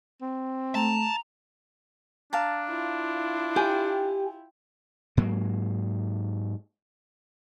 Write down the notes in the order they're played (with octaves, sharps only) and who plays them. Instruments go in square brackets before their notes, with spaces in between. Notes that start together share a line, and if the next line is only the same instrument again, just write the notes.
[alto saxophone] C4
[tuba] A3 [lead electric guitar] A5 [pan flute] A#5
[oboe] D4 [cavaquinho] F5 A5 A#5
[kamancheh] E4 F4
[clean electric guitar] G4 G#5 [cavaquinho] G5
[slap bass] G#2 F#3 A#3